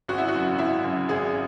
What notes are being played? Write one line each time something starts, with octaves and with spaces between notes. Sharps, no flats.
G#1 F#4
E4
F#4
F#2 C#3
G#1 E4
F#2 C#3
G#1 G#4